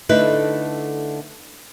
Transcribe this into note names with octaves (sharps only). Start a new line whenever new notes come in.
D3 A3 D#4 E4 B4